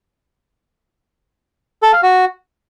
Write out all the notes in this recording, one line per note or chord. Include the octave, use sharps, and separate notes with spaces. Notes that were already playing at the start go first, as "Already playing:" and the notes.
A4
F5
F#4